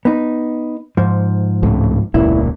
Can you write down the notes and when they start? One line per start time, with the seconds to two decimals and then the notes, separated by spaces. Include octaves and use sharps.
0.05 B3 D#4
0.97 G#2 F3
1.63 C#2 A2
2.14 E1 C#2 A#2 E4